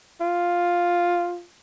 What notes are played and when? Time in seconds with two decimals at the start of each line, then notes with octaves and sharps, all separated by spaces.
0.21 F4